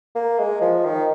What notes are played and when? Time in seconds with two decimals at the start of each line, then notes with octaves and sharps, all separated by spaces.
0.15 A#3
0.39 G#3
0.61 F3
0.85 D#3